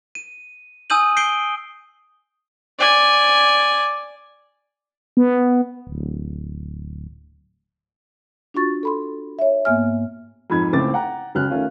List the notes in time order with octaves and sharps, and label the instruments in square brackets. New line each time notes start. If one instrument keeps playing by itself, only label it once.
[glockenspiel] D#7
G#5 D#6 E6 G6 D#7 F#7
G6 C7 D7 D#7 G7
[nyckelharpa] D5 G#5
[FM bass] B3
D1
[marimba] D4 F4 F#4 C#6 A6
A4 B5 C6
C#5 E5
G#2 A#3 B3 E5 G#5 F6
[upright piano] F2 G#2 B5 G#6
C#2 A2 A3 C4 D6 A6
F#5 G5 A#5
C#2 F#3 C#4 F6 F#6
D#3 A3 C#4 F4